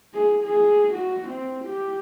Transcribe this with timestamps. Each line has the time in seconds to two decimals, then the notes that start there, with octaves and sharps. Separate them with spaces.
0.14 G#4
0.44 G#4
0.94 F#4
1.29 C4
1.65 G4